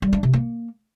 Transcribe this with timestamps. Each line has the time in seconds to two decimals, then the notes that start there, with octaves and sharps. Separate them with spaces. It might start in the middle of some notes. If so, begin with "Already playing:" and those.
0.02 G3
0.13 D4
0.23 C3
0.33 A#3